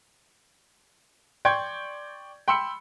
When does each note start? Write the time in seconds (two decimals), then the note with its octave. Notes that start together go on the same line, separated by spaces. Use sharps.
1.45 D5 G5 C6 C#6 G6 G#6
2.48 G5 B5 C6 E6 C#7